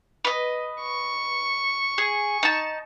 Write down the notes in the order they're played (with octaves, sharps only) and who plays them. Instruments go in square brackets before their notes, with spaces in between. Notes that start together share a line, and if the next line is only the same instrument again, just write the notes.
[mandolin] B4 D#5
[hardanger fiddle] C#6
[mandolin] G#4
D#4 A5